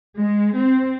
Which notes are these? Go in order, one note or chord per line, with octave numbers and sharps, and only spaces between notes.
G#3
C4